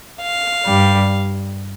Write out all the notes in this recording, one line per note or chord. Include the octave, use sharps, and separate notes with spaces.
F5
G2 G3